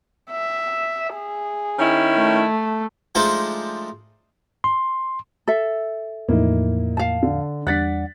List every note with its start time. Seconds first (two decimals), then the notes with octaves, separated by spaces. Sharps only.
0.31 E5
1.15 G#4
1.79 D#3 C#4 E4
2.16 A3
3.15 F3 G#3 A3 D4 D#4 C5
4.64 C6
5.48 A4 E5
6.29 E2 A2 F3 A#3 D#4 E4
6.97 F5 A5
7.23 D3
7.67 E2 G3 D4 D5 F#5 F#6 A6 B6